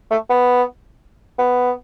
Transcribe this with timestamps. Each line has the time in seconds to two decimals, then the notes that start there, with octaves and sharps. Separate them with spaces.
0.11 A3
0.30 B3
1.39 B3